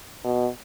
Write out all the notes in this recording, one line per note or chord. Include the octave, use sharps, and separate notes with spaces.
B2